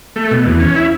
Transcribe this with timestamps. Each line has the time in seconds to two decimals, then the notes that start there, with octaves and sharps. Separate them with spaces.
0.16 A3
0.31 B2
0.45 E2
0.60 C#4
0.76 E4